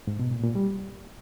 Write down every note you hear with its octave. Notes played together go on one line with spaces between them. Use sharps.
G#2
B2
A#2
A#2
G3